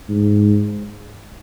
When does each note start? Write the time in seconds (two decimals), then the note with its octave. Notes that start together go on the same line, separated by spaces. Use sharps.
0.09 G#2